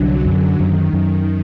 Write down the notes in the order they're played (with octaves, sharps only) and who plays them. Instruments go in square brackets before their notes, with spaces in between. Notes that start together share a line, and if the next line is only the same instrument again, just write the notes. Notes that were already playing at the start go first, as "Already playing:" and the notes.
Already playing: [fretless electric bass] C2 D4 [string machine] D3 F#3
[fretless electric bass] F#2
[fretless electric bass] F#2 [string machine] D#3
[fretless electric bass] F#2 [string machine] D#3